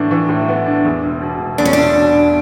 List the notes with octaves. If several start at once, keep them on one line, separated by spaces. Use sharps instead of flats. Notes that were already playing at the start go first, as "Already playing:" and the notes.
Already playing: A2 E3 B3 D4
E3
A2
B3
D4
E2
E1
B2
E1
E2 D4
C#4
E1 D4
B2
E1